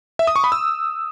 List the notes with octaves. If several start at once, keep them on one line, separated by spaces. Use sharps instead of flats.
E5
D#6
C#6
B5
E6